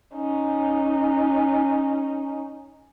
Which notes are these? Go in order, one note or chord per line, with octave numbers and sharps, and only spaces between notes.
C#4 D#4